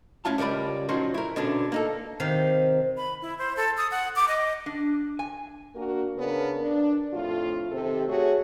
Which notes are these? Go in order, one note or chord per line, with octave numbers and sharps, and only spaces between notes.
A3 C#4 E4 F4 A5
C#2 G3 A#4 D5 B5
F3 F#3 C#4 D#4 C5
E4 A#4
B2 D3 C#4 D4
A#3 D#4 A4
C3 D#3 F5
B5
E4
C5
A4
D#6
F#5
D6
D#5
D4
G#5
A#3 D4 F#4 A#4
C#3 B3 D4 A#4
D4
F2 A2 F4
C3 D#3 C4 G4 A4
A3 F#4 G#4 C#5